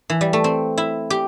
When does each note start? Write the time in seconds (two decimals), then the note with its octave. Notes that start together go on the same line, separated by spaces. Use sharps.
0.10 E3
0.21 G3
0.33 A3
0.44 C4
0.78 E4
1.10 G4